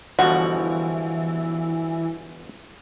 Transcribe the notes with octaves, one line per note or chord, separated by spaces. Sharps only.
G1 B2 E3 F3 F#4